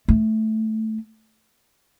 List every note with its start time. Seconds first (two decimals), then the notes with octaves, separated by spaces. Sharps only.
0.08 A3